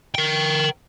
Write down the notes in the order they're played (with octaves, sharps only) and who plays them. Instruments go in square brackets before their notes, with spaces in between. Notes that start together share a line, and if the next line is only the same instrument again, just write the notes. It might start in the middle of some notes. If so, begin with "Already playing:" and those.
[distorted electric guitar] A#4 G5